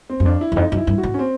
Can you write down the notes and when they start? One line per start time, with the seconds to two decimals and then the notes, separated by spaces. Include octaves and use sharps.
0.10 C4
0.20 F#2
0.25 F2 D4
0.41 E4
0.52 E2
0.56 F2 D#4
0.71 F#2 D#4
0.77 E4
0.87 G2
0.98 F#4
1.03 G#2
1.14 C#4
1.19 C4